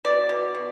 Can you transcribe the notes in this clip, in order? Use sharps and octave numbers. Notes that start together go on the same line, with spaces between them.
B2 D5
B2
B2